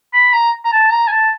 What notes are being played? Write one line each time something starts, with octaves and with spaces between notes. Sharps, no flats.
B5
A#5
A#5
A5
A#5
G#5
A5